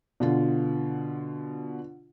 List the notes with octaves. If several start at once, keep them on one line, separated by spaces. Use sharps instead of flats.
B2 D3 F4